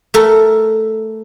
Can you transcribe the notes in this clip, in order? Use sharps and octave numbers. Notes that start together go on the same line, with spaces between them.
A3 A4 A#4